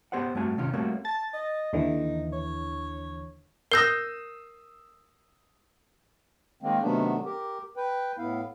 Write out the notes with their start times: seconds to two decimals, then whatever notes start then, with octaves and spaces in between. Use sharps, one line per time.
0.12 B3 G4 C5 C#5 F#5
0.35 G2 A3 C4 F#4 G#5
0.58 C3 D#3 C#4 F4
0.73 G3 A3 A#3 C4 F#4 C#5
1.05 A5 A6
1.33 D#5
1.73 D#2 D3 E3 D#4
2.33 C#5
3.72 A#4 D#6 E6 G6 A#6 C7
6.63 D#3 G#3 A#3 C4
6.82 C3 D#3 F#3 A3 B3 D4
7.25 G4 A#4
7.77 B4 G5
8.18 A2 B3 E4 F5